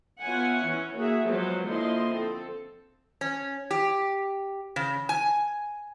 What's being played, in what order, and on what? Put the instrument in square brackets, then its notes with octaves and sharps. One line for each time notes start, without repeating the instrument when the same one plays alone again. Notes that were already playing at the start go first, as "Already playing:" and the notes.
[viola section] B3 F4 C#5 E5 F#5 G#5
E3 C#4
A#3 F#4 G#4 E5
F3 F#3 G#3 B3 B4 C5
D3 F3 A#3 E4 D#5 C6
C4 A4
[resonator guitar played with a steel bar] C#4
G4
C#3
G#5